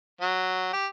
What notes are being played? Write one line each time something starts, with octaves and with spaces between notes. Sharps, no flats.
F#3
G4